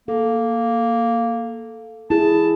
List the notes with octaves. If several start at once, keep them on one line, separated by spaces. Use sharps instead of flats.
A#3 A4
E4 G#4 A5